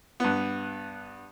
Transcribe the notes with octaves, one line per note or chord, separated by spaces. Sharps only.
G2 B3